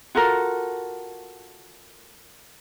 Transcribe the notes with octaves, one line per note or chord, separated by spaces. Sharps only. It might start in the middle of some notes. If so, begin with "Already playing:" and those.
F4 F#4 A4 A#4